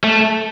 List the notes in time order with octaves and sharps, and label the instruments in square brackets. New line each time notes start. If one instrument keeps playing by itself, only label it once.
[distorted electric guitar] A3